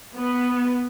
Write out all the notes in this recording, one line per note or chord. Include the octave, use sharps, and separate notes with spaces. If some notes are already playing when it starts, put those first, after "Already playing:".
B3